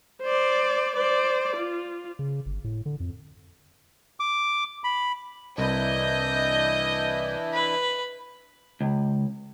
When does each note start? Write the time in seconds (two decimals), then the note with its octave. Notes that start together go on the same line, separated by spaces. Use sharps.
0.23 C5 D5
0.97 C5 D5
1.57 F4
2.19 C#3
2.46 G1
2.64 A2
2.86 D3
3.00 F2
4.20 D6
4.84 B5
5.58 C2 E3 D4 E4 D#5 G6
7.53 B4
8.81 C#2